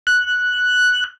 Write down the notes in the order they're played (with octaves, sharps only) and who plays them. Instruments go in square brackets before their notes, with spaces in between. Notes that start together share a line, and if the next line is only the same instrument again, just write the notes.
[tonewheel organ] F#6